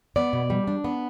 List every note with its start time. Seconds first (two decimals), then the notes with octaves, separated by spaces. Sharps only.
0.16 B3 D5
0.33 B2
0.50 G3
0.67 D4
0.84 B3